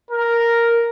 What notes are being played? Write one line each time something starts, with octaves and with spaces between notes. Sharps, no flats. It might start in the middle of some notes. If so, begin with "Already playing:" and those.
A#4